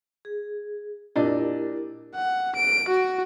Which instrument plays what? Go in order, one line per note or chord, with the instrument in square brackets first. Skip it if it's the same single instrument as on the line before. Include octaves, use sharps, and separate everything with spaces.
[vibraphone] G#4
[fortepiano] A#2 D4 D#5 [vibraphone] E4 G4 A#4
[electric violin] F#5
D7
F#4